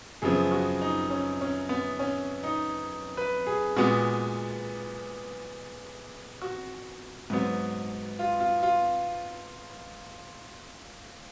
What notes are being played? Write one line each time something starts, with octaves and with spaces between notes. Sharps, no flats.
F#2 C#3 F3 B3 G#4
F#4
D#4
C#4
C#4
B3
C#4
D#4
B4
G#4
A#2 G#3 B3 F#4
F#4
G#2 F#3 B3
F4
F4
F4